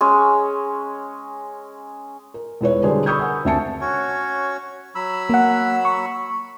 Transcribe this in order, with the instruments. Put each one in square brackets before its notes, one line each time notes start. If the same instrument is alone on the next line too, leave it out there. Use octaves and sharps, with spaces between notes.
[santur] G#3 C#4
[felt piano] A#4
E1 E4 B4 C#5
D3 G3 F#4 G#4 A#4 C5
B5 C#6 D#6 E6 G6 G#6
A#4 F#5 G#5
D2 C4 E5 G#5 A5 C#7
[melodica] C#4 F#4 C#5
F#3 B5 E6
[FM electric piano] A#3 F#5
C#6